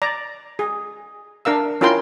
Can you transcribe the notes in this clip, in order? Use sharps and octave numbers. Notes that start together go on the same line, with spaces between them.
D5 A#5
G#4
D4 A#4 F5 E6
C#4 E4 F4 A#4 G5 C6